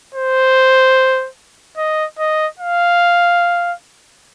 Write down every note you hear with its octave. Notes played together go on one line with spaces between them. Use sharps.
C5
D#5
D#5
F5